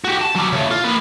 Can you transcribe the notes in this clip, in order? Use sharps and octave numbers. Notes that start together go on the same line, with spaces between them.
F#4 G4
A5
F#3 G3
C#3 A3
F4
A#3 B4